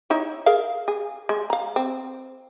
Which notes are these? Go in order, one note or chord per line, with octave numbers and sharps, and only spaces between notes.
D#4 E4 C#5
G#4 A#4 F5
G#4
G#3
F5 A#5
C4